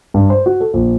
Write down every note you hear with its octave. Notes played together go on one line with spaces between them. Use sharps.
G2
C5
F#4
A4
A#1